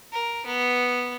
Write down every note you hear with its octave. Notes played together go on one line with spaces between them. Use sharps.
A#4
B3